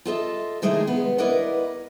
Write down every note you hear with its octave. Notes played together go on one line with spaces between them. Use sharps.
F4 A4 D#5 E5
C3 D#3 G#3 A3 E4 G#4
B3 B4
E4 A#4 B4 D5 D#5 F#5